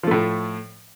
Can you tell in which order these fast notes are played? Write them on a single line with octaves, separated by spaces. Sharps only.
F3 A3 A2